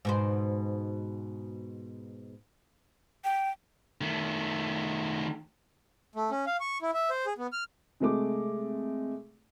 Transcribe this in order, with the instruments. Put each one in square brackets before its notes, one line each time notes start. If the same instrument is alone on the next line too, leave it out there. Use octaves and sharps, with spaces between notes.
[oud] G#2 B2 C5
[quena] G5
[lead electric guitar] D#3 A3
[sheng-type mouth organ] A3
C#4
F5
C#6
E4
E5
C5
G#4
B3
F6
[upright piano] C3 G#3 A3 D6